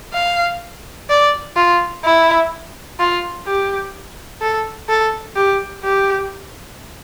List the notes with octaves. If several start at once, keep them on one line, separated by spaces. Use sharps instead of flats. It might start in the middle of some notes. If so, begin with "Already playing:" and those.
F5
D5
F4
E4
F4
G4
A4
A4
G4
G4